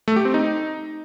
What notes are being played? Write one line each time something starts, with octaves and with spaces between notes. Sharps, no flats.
A3
G4
C4
D#4